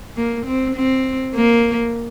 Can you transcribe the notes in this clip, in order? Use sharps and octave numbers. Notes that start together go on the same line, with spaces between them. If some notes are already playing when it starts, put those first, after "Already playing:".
A#3
C4
C4
A#3